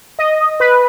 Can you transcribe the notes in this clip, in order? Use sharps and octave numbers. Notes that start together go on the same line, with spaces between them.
D#5
B4